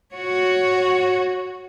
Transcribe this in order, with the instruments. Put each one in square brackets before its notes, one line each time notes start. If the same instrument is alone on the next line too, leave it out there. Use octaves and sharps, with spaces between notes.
[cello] F#4 C#5